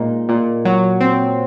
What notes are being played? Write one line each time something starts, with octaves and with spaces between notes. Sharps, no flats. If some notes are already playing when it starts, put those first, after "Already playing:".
Already playing: A#2 G#3 D#4
A#2
F#3
C4